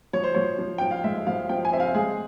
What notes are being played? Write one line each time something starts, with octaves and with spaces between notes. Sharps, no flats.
F3 C#5
C5
F3 C#5
F3
F3 G5
F5
G#3 E5
F3 F5
F3 G5
G#5
C4 E5
F5
G#3 G#4